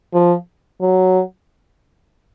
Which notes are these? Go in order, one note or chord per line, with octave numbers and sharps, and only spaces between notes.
F3
F#3